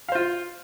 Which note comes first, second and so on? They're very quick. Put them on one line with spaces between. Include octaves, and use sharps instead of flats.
F5 C5 F4